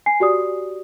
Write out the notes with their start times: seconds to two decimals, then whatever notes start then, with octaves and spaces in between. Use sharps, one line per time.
0.06 G#5 C7
0.20 F#4 G4 D5 D#6